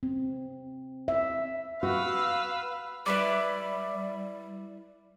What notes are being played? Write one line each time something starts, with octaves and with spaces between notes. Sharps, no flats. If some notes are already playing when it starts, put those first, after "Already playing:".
C4
E5
F#4 B4 F5 E6
G3 E4 B4 D5